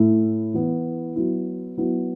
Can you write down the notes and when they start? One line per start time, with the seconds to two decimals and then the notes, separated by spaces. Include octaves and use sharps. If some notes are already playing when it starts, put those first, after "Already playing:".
Already playing: A2 A3 E4
0.54 E3 B3 E4
1.16 F#3 B3 E4
1.78 F#3 B3 E4